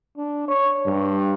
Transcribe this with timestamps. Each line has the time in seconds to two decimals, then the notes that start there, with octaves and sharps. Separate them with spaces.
0.17 D4
0.48 C#5
0.86 G2